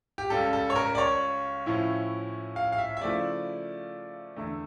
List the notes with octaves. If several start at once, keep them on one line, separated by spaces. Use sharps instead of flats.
G4
C#2 C#3 G3 A4
A4
C#5
A#4
D5
C#5
A2 F3 C#4 E4
F5
F5
E5
E5
C#3 F3 A3 E4 D5
E2 D3 A3